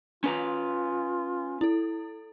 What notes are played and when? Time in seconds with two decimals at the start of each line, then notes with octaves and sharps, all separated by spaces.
0.24 C#4 F4 B4 A#5
1.61 E4 A4